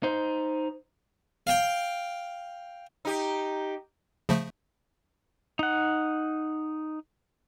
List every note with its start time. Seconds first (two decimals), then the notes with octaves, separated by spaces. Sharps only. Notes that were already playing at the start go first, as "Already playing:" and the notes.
0.03 D#4 C5
1.47 F5 G5
3.05 D#4 G4
4.29 C#3 F3 A3
5.59 D#4 F#5